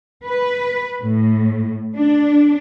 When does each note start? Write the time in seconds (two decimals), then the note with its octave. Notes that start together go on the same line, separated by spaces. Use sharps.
0.25 B4
1.01 A2
1.96 D4